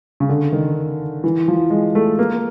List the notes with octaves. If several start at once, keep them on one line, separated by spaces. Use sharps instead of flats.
C#3
D3
D#3
E3
F3
G#3
A3
A#3